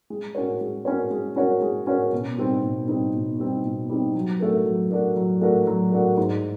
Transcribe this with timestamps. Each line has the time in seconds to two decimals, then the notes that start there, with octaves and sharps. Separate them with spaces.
0.10 G#3
0.35 C#4 F#4 A#4 C#5
0.61 G#3
0.85 C#4 F#4 A#4 C#5
1.11 G#3
1.36 C#4 F#4 A#4 C#5
1.61 G#3
1.87 C#4 F#4 A#4 C#5
2.13 B2
2.38 G3 C4 D#4
2.63 B2
2.88 G3 C4 D#4
3.13 B2
3.40 G3 C4 D#4
3.64 B2
3.89 G3 C4 D#4
4.15 F#3
4.40 A3 D4 F#4 A#4
4.65 F#3
4.90 A3 D4 F#4 A#4
5.16 F#3
5.41 A3 D4 F#4 A#4
5.67 F#3
5.92 A3 D4 F#4 A#4
6.17 G#2